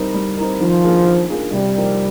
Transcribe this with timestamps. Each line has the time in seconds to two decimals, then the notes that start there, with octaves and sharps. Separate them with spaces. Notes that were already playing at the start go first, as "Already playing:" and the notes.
Already playing: G3 C4 D#4 A#4
0.14 G3
0.37 C4 D#4 A#4
0.61 D#3 F3
0.84 A#3 D4 F4 G#4
1.07 D#3
1.30 A#3 D4 F4 G#4
1.52 C3 G3
1.76 F3 A#3 D#4 A#4